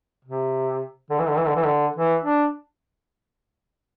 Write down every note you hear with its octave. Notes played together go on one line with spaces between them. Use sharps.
C3
D3
E3
D3
E3
D3
E3
D3
E3
D4